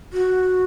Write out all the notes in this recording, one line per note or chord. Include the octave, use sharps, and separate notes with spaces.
F#4